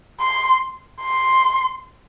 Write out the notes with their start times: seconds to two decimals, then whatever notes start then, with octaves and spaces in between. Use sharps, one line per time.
0.21 C6
1.02 C6